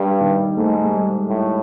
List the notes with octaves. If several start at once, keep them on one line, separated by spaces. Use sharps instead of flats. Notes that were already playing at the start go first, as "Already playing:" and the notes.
Already playing: G2 G3
D#3
G#2 A3
G#3
G3
A2